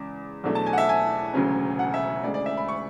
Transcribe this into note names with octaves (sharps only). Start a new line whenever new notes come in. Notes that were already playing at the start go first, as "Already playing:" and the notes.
Already playing: E2 C#3 G#3 D6
E2 B2 F#3 A3 D4
A5
G#5
F#5
E5
G#5
E1 D2 C#3 F#3 C#4
F#5
E5
D2 C#3 G#3 D5
D5
E5
B5
C#6